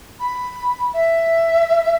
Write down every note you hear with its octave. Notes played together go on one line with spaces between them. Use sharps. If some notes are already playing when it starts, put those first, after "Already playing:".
B5
E5